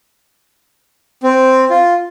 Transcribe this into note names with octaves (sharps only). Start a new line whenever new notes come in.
C4
F4